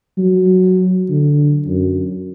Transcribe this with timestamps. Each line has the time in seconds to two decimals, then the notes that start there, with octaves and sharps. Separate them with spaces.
0.18 F#3
1.09 D3
1.67 F#2